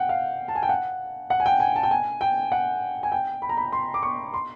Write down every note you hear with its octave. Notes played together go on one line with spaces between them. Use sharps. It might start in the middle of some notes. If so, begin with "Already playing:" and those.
Already playing: F#5 G5
F5
A5
G#5
G5
F#5
F#5
G#5
G5
G#5
A5
G5
G#5
G5
F#5
G#5
G5
B5
A#5
B5
C6
D6
C#6
C6